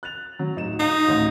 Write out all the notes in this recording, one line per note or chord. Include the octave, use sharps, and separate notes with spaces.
F#6 A6 F7
F#3
D1 D#4 E7
D#4 F5 C7
A1 D2